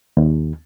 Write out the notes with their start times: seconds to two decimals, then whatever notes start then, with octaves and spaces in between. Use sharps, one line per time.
0.17 D#2